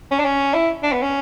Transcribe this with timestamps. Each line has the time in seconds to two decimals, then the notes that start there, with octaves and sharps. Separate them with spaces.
0.11 C#4
0.19 D4
0.25 C#4
0.54 E4
0.83 D4
0.92 B3
1.02 C#4